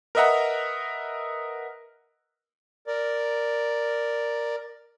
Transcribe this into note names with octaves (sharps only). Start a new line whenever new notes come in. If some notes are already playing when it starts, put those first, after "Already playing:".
A#4 B4 D#5 E5 F#5 A#5
A#4 D5